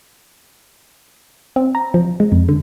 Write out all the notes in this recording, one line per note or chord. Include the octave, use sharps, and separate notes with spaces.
C4
A#5
F3
G#3
F2
D3